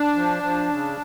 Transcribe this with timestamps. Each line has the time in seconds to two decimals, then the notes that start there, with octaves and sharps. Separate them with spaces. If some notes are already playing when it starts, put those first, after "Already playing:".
Already playing: D4
0.16 F3
0.43 F3
0.70 C#3